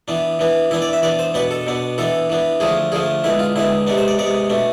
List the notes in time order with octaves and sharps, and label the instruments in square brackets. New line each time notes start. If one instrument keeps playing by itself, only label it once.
[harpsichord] E3 B3 D4
E3 B3 D4
E3 B3 D4 E4
D5
E5
E3 B3 D4 D5
C5
B2 B3 D4 B4
A4
B2 B3 D4
E3 B3 D4 A4
E3 B3 D4
D3 F3 A3 G#4
D3 F3 A3 G#4
D3 G#3 B3 E4
F4
D3 G#3 B3 E4
C3 G#3 B3 D4
C5
D5
C3 G#3 B3 D5
B2 A3 D4